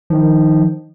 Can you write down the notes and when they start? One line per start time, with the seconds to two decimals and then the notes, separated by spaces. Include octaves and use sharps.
0.10 D#3 F3